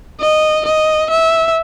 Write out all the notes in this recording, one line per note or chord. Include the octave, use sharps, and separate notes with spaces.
D#5
D#5
E5